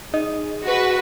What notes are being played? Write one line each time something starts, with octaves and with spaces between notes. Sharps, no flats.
D#4 G#4 D#5
F#4 B4